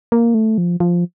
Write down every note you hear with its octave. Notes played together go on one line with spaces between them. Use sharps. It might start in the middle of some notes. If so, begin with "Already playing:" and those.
A#3
A3
F3
F3